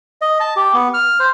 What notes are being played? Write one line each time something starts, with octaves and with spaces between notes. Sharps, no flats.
D#5
A5
G4
B3
F6
C5